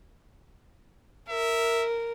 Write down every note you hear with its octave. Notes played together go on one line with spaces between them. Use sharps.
A#4 E5